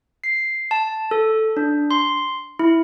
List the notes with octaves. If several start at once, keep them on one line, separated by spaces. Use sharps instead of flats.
C7
A5
A4
D4
C6
E4